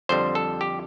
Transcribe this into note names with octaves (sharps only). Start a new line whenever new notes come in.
F2 D3 G3 C5
A4
G4